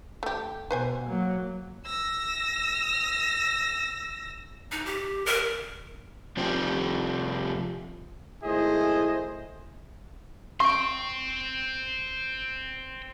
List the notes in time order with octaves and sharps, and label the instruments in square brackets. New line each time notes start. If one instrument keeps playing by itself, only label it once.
[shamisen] A3 G4
[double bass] B2 [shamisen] B4 C5 G#5
[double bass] F#3 A#3
[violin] E6 A#6
[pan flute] D#4
G4
A#4
[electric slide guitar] C3 F3 G3 C4 G4
[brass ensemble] G#1 A3 E4 G#4 C5 D#5
[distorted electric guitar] C5 G5 [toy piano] C#6